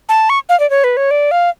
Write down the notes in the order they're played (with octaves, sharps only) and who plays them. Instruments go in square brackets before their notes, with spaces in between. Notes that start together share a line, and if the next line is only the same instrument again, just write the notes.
[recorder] A5
C#6
F5
D5
C#5
B4
C#5
D5
F5